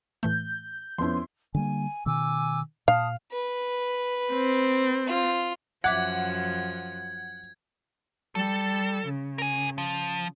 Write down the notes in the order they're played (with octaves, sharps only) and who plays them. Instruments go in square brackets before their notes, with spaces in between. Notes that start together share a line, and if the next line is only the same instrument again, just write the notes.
[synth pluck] A2 E3 A3 [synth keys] G6
[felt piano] F2 B3 C#4 [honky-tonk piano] E4 C6
[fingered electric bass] D3 G3 A#3 [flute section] G#5
[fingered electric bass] B2 D#3 [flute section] G#5 D6 E6
[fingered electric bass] A#2 [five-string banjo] F5 [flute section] A5 D#6
[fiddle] B4
[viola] C4
[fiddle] F4
[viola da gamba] F#2 F3 [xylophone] E5 D6 F#6 [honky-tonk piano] F#5 [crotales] G#6
[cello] G3 [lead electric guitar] A4
[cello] C#3
[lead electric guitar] A#4 G#5
F3